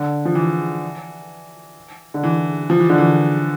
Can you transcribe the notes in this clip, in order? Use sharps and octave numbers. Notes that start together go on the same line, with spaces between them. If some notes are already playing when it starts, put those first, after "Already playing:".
Already playing: D3
F3
E3
D3
E3
F3
E3
D3
E3